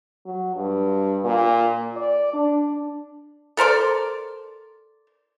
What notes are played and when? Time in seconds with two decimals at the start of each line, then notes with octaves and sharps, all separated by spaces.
0.26 F#3
0.56 G2
1.24 A#2
1.97 D5
2.34 D4
3.57 A4 A#4 C5 D5